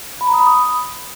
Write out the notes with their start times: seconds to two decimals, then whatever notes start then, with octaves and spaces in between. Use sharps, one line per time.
0.21 B5
0.27 A#5
0.34 D#6
0.40 B5
0.47 D#6